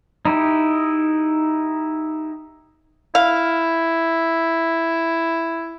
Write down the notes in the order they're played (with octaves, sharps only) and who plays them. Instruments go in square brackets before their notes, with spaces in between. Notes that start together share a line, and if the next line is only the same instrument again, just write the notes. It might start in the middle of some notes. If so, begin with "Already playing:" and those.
[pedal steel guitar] D#4 E4 G4
[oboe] E4 [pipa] F5